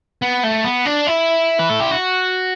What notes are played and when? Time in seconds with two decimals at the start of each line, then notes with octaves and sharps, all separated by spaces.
0.22 B3
0.44 A3
0.64 B3
0.86 D4
1.07 E4
1.59 B4
1.70 A4
1.80 G4
1.91 F#4